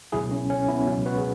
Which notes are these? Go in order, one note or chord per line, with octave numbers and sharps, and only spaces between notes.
C#2 B2 F#3 E4 G#4
C#4
C#4
B3 E4
C#2 B2 F#3 C#4 F#4
F#4 B4
G#4